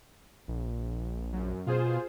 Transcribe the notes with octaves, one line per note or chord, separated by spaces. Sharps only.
A#1
F#2
B2 F4 G#4 C5